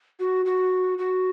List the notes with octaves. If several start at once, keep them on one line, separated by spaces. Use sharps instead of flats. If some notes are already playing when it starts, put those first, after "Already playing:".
F#4
F#4
F#4